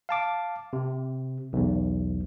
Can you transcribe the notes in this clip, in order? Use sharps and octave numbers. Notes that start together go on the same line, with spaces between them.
F5 A5 D6
C3
B1 E2